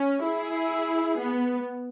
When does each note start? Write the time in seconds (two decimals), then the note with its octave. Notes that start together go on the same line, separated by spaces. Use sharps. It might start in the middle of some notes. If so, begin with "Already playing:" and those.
Already playing: C#4
0.23 E4 G#4
1.17 B3